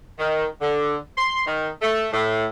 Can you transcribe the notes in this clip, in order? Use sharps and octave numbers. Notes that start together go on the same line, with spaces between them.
D#3
D3
C6
D#3
A3
A2